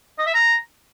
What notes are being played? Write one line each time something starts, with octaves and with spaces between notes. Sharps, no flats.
D#5
E5
A#5